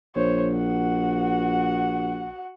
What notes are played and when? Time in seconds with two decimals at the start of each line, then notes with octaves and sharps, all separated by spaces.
0.16 A#1 C5 C#5
0.55 F#4 F#5